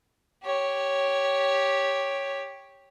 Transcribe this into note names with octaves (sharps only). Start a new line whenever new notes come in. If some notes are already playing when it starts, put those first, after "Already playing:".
G4 C#5